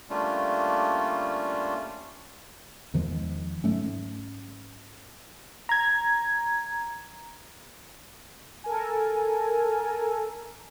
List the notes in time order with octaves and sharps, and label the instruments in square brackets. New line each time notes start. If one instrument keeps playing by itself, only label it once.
[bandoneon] G3 A3 A#3 C#4 D4 F4
[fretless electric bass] E2 D#3 F3 G#3
G#2 F#3 A3 C#4
[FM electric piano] A#5 G#6
[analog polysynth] A4 A#4 G#5